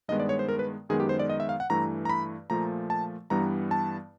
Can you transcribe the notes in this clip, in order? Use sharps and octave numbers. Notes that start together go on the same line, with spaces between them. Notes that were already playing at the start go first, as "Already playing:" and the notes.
G2 D#3 G#3 B3 D#5
D5
C#5
C5
A#4
B4
F#2 D#3 G#3 B3 G#4
G4
C5
D5
D#5
E5
F5
F#5
G2 E3 A3 A#5
A#5
B5
A#2 F3 A3 A#5
A5
G2 E3 G3 B3 A#5
A5